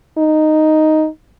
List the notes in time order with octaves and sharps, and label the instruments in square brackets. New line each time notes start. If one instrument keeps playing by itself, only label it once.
[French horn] D#4